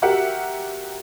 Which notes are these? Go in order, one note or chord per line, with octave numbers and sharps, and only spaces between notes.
F#4 G4 A#4 E5 F#5